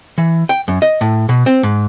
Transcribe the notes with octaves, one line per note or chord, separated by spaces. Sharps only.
E3
G5
F#2
D#5
A2
B2
C4
G#2